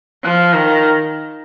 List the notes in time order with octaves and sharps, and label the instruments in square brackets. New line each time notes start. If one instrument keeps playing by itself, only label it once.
[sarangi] F3
D#3